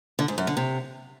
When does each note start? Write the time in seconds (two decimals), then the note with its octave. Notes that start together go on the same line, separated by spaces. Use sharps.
0.19 D3
0.28 G#2
0.38 F#2
0.47 D3
0.57 C3